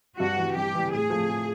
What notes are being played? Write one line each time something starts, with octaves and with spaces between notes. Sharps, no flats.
G2 F#4
E3 G3
G2 G4
E3 G3
A2 G#4
F3 A3
A2